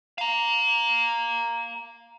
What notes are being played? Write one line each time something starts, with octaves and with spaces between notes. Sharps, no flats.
F5 A#5